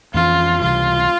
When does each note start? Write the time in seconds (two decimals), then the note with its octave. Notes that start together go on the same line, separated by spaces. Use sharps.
0.14 F2 E3 A#3 C#4 F4
0.61 C#2 C3 E3 G3 F4